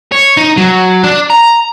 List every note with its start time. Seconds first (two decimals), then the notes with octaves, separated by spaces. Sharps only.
0.12 C#5
0.37 D#4
0.57 F#3
1.04 D4
1.30 A#5